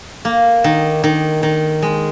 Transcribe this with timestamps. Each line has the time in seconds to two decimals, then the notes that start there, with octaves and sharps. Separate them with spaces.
0.25 A#3
0.64 D#3
1.04 D#3
1.43 D#3
1.82 G#3